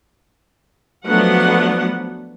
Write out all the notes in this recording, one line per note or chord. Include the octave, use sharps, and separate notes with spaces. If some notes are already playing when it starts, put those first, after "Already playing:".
F3 F#3 A3 B3 D4 F#5